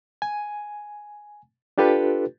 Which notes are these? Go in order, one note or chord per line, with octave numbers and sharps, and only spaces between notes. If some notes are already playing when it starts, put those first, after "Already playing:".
G#5
D4 F4 G4 A4 B4